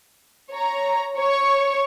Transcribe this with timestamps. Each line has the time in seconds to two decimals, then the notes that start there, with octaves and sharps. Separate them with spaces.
0.51 C#5 A#5
1.17 C#5 C#6